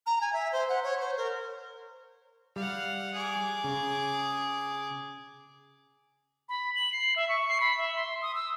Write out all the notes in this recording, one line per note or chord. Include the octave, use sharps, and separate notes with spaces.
A#5
G#5
E5
C5
F#5
C#5
C5
A#4
G3 F5 F#5
G#4 D6
C#3
B5
F#7
C7
E5
C#6
C7
B5
E5
C6
D#6
E6